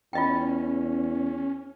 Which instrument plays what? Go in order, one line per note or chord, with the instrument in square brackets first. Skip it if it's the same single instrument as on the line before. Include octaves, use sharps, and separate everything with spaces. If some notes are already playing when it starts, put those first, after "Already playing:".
[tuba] E2 [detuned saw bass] C#4 [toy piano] F4 D#5 G5